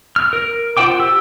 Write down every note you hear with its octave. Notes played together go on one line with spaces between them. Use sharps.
F6
A#4
F4 C5 F#5 G5 D6
G4 E6